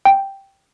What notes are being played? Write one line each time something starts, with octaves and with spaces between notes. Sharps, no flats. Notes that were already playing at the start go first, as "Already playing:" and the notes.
G5